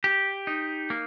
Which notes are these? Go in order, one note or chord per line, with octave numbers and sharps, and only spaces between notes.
G4
D#4
A#3